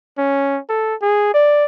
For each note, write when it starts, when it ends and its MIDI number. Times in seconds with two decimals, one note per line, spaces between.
0.18 0.59 61
0.69 0.95 69
1.02 1.29 68
1.34 1.65 74